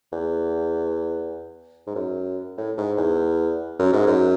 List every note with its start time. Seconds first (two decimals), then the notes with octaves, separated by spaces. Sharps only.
0.12 E2
1.87 G#2
1.95 F#2
2.58 A2
2.78 G#2
2.97 E2
3.79 F#2
3.93 G#2
4.07 F#2